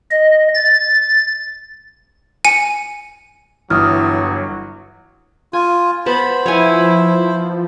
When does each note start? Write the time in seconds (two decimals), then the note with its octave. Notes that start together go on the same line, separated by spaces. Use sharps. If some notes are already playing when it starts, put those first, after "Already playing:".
0.11 D#5
0.54 A6
2.45 G#5 C#7 D#7
3.70 G1 E3 F#3 D#6 F6
5.53 F4 G#5
6.06 B3 C5 A5 B5
6.46 F3 E4 C#5 F5 G#5